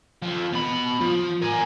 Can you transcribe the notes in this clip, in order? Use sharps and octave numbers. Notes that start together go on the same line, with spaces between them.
F2 F3
B2 B5
F3
A#4 G#5